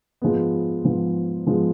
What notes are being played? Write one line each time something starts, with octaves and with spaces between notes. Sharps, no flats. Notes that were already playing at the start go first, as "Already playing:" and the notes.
G#2 F3 G#3 B3
G#2 F3 G#3 B3
G#2 F3 G#3 B3